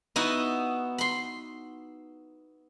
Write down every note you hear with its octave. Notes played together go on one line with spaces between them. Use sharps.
B3 D#4 E4 F#4
B5 C6